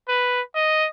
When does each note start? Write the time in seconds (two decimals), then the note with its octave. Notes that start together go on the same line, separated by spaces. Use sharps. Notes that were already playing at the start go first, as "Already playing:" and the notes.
0.08 B4
0.55 D#5